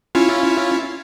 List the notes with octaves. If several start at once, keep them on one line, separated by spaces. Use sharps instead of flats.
C#4 E4 F4